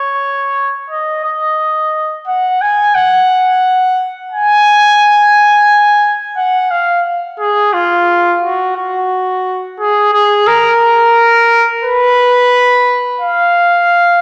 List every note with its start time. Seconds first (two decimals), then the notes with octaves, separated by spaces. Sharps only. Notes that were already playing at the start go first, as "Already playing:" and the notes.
Already playing: C#5
0.91 D#5
1.25 D#5
2.27 F#5
2.61 G#5
2.95 F#5
4.32 G#5
6.37 F#5
6.71 F5
7.40 G#4
7.74 F4
8.42 F#4
8.77 F#4
9.79 G#4
10.13 G#4
10.47 A#4
11.84 B4
13.21 F5